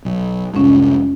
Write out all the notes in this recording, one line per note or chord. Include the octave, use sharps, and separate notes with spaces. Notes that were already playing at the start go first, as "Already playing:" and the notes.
B1
C2 F2 G#2 C#4